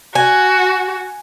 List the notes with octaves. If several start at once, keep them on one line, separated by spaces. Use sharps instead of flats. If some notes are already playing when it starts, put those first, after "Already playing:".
F#4 G#5